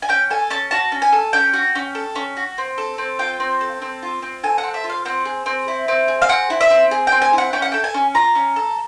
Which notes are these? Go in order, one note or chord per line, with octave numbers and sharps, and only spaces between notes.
G#5
C#4 G5
A4 G#5
C#4 A5
F#4 A5
C#4
G#5
A4
C#4 G5
F#4
C#4
A4
C#4
F#4
C4
A4
C4
F4 G5
C4
A4
C4
F4
C4
A4 G#5
F#5
C4
E5
F4
F5
C4 F#5
G#4
C4
E4
C4
G#4
F5
C4 F#5
E4
E5
C4
G#4
C4 G5
G#5
E4
F#5
C#4 G5
F#5
A4 G5
G#5
C#4
F4 A#5
C#4
A4